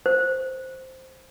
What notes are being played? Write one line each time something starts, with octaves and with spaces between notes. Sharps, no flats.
C5